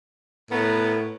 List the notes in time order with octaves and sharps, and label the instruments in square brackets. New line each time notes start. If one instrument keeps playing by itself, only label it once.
[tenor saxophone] A2 [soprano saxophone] B3 [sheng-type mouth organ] A#4 B4